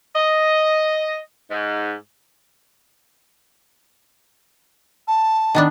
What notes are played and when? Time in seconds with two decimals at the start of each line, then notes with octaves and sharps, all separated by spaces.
0.15 D#5
1.51 G#2
5.08 A5
5.55 D#3 B3 D4